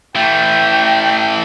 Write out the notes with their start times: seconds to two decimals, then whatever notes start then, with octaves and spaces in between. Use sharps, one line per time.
0.15 E3 A3 G5